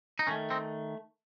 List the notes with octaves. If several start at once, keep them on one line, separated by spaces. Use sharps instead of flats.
D#4
D#3 A3 C#4
C4 D#4